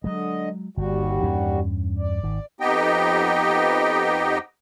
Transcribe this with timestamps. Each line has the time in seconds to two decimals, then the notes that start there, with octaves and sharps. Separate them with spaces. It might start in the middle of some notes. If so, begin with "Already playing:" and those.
0.04 D3 F#3 G#3 D#5
0.77 G1 D#2 G3 F#4
1.23 E2 G2 C#4
1.99 D5
2.23 G#1 D#3
2.60 F2 B3 D#4 G4 D#5 G5